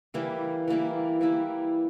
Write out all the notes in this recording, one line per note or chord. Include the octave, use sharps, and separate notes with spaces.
E3 G3 A#3 E4
E3 G3 A#3 E4
E3 G3 A#3 E4